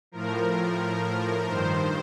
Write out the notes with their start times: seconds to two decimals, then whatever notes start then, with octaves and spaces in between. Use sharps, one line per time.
0.12 A2 F3 A#4
0.56 A2 F3
1.01 A2 F3
1.46 G2 D#3 C5